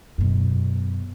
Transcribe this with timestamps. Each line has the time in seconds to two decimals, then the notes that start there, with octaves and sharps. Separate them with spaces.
0.18 F#2 B2